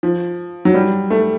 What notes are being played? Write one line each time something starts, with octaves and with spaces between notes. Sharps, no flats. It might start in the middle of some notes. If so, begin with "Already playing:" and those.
F3
F#3
G3
A3